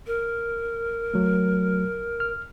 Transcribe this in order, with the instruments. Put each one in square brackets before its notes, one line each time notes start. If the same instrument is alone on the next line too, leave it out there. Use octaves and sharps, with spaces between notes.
[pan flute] A#4
[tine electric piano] F#3 A3
F6